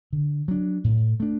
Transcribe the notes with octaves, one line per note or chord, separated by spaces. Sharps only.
D3
F#3 D4
A2
A3 D4